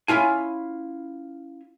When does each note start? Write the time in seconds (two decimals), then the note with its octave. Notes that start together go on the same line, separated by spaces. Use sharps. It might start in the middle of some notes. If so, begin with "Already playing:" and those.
0.08 C#4 E4 F4 G#5